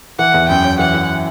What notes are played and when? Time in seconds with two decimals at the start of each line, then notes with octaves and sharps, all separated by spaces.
0.19 E3 F#5
0.34 E2
0.49 F#2 G5
0.64 C#4
0.79 E3 F#5
0.94 E4